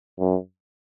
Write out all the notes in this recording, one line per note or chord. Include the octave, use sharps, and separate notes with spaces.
F#2